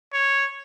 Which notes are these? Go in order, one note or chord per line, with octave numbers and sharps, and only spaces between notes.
C#5